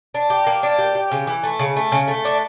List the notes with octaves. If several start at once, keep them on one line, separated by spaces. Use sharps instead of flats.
D4
G4
A#3
D4
G4
G4
C#3
E3
A3
C#3
A3
C#3
A3
D4